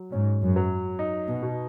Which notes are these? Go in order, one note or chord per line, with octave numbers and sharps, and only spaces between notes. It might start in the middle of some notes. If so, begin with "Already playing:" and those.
Already playing: F#3
G#2 C#4
F#2
F#3
D#4
B2
B2